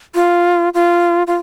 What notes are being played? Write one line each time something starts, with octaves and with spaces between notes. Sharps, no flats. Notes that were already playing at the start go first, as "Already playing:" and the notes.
F4
F4
F4